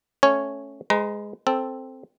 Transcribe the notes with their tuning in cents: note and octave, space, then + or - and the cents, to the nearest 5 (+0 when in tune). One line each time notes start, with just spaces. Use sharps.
A3 -5 C#4 -5 C#5 +0
G#3 +0 B4 +40 A#5 +20
C4 +0 A4 +0